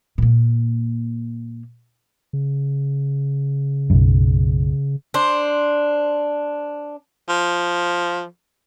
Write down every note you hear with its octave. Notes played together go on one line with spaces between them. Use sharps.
A#2 A#3
C#3
B1 F#2
D4 C5
F3